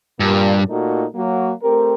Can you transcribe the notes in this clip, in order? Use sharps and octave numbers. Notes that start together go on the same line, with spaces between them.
G2 A#2 G3 A#3
A#2 A3 D#4 F#4
F#3 A#3 F#4
A3 C4 G4 A#4